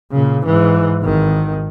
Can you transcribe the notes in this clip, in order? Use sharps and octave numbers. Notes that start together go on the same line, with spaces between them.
A#2 C#3
G#2 E3
G#1 D#3